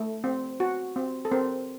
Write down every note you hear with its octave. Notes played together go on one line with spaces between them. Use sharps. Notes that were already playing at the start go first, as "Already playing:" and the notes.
Already playing: A3
C4
F#4
C4
A4
C4 A#4